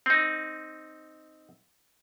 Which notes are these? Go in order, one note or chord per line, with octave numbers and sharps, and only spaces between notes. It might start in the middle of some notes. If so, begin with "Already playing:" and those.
C4 D#4